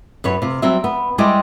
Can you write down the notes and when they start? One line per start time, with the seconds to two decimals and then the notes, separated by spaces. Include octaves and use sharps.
0.24 F#2 B4 C#5
0.42 C3 F4
0.62 F#3 G3 C4 E5
0.84 B3
1.18 G3 G#3 E4 G4 G#4 C5